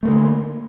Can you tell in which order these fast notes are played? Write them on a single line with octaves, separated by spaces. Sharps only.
A3 A#3 D3